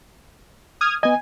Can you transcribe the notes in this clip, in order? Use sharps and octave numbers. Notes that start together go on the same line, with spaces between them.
D#6 F6 G#6
B3 D#5 G#5